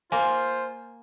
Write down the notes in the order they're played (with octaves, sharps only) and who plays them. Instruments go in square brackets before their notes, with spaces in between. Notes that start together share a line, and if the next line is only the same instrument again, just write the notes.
[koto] A#3 [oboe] F4 [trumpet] C5 [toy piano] G#5